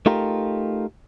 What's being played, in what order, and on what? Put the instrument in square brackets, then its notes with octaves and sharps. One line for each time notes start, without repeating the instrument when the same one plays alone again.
[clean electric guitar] A3 D#4 F4 G4 A#4